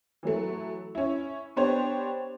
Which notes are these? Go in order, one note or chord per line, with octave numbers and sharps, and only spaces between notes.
E3 F#3 A3
C#4 E4
B3 D4 G4 C5 C#5